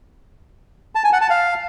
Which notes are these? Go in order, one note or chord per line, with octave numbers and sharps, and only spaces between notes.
A5
G#5
F#5
A5
F5